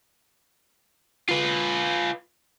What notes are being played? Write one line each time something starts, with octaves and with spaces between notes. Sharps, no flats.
F4 B4